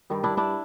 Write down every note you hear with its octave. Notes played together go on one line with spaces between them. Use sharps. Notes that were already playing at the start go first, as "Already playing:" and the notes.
G2 D#3 G3
D4 E4
D4 E4